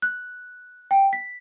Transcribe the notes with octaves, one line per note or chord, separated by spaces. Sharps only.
F#6
G5
B6